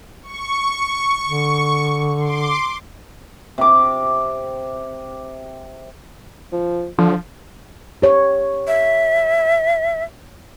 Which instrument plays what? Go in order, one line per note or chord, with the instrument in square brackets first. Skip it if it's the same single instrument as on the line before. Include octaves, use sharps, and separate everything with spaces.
[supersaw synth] C#6
[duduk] D3
[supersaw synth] C6 D6
[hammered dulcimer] C3 D6
[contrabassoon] F3
[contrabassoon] D3 [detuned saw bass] F3
[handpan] G4 C#5
[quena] E5